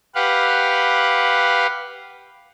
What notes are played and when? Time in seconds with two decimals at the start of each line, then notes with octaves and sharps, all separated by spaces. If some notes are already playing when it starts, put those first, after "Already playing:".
0.15 G4 B4 F5 F#5